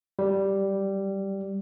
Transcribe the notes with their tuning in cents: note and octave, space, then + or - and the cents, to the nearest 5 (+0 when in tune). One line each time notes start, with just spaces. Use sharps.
G3 -5